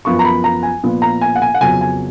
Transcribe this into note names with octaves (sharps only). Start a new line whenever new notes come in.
F#2 F3 B3 F4 C#6
A#5
B5
A#5
G#5
A#2 F3 B3 F4
A#5
G#5
F#5
G#5
F#5
F2 C#3 F#3 B3 G#5
G#5